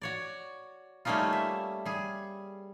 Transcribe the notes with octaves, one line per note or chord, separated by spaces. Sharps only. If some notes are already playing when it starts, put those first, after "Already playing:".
F#4 C#5 D5
G3 A3 A#3 C#4 D#4 F4
E5
G3 G#4